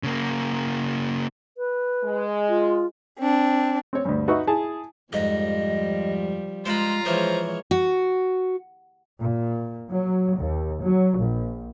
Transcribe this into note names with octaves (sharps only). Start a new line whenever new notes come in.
C#3 A#3
B4
G#3
F4
C4 D4
C4 C#5
D2 G2
D#4 F#4 B4 D#5 E5 C#6
E4 G#4 A5
F2 G#2 F3 G3 D#5
G#3 F4 C5 A#5 B5
E3 F3 G#3 A#4 C5 C#5
F#4
A#2
F#3
D#2
F#3
A#1